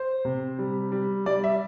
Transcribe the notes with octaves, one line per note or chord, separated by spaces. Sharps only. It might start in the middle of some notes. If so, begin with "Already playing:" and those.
Already playing: C5
C3
G3
G3
G3 D5
E5